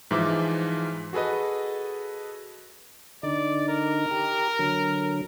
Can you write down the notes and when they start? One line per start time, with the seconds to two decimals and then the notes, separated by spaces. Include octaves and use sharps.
0.11 G#2 E3 F3 E5 D6
1.13 F#4 G#4 A4 B4 D#5
3.23 D3 D#4 D5
3.68 A#4
4.11 G4
4.59 D3 F#3